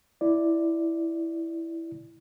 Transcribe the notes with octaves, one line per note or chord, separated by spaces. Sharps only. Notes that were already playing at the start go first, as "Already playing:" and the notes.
E4 D5